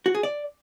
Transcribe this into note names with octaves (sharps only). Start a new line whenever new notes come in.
F#4
G#4
D5